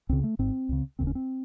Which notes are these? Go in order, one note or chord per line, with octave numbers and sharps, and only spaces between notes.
C#2 C#3 C4
A3
G#1 G#2 C4
C#2 C#3
E1 D#2 C#3 C4
C#4
C4